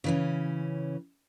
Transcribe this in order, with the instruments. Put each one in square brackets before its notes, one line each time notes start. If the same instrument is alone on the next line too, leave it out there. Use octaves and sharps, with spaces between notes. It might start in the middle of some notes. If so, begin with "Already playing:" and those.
[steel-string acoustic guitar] C#3 E3 C#4